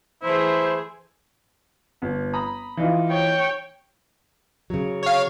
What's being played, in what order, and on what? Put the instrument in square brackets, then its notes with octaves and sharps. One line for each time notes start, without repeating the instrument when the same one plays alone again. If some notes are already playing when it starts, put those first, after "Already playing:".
[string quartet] E3 A3 G#4 [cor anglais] E4 [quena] C5
[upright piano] G1
A#5 B5 D#6
E3 D#4 F4
[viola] C#5 G5
[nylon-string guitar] C#3 F#3
[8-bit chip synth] C#5 F5